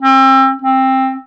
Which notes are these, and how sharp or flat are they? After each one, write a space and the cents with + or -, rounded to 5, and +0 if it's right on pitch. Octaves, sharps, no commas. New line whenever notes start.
C4 +30
C4 +15